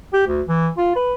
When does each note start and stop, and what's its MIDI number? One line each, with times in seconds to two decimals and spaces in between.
0.13 0.27 67
0.27 0.42 38
0.48 0.69 52
0.78 0.92 65
0.96 1.15 71